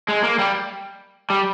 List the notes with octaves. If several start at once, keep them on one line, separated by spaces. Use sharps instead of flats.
G#3
A#3
G3
G3